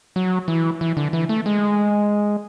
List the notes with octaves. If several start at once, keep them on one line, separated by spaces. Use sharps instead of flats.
F#3
E3
E3
D3
E3
A3
G#3